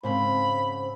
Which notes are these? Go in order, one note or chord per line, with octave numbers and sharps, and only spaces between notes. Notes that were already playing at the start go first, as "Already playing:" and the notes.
G#2 C#3 C4 B5